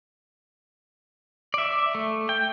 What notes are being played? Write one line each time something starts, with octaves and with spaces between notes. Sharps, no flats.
D5 E5
A3
G5